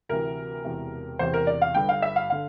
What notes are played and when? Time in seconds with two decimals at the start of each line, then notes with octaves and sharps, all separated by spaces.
0.09 D2 C3 E3 A#4
0.65 E1 E2 C3
1.19 E1 E2 C3 C5
1.34 A#4
1.47 D5
1.62 F5
1.75 G1 G2 D3 G5
1.89 F5
2.02 E5
2.16 F5
2.30 D3 F5